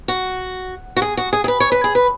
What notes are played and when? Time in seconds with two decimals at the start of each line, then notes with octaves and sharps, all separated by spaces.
0.08 F#4
0.97 F#4
1.02 G#4
1.17 F#4
1.33 G#4
1.44 G#4
1.48 B4
1.60 C#5
1.72 B4
1.84 G#4
1.95 B4